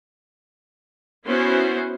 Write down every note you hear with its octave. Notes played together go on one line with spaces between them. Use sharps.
B3 C#4 E4 F#4 C5